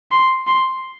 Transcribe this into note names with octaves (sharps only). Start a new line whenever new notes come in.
C6
C6